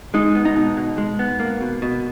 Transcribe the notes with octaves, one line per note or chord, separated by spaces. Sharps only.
G#3 D#4
B3
D#4
B2
B2
G#3
B3
A#3
B2
B2